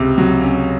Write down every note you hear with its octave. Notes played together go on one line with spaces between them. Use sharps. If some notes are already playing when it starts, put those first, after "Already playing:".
Already playing: C#2 C3
F#3
C#4